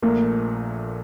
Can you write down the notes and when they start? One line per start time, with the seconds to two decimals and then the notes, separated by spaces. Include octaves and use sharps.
0.02 A#1 A#2 A3 A#3